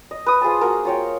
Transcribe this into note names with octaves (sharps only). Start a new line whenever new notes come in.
D#5
B4 D#6
F4 G#4 C5 A5
A#3 F#4 A#4
F4 C#5 G5